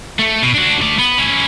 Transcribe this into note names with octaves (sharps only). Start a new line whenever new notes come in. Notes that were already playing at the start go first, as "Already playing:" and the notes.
A3
B2
D4 F#4
A3 D5
B3
C#4 E4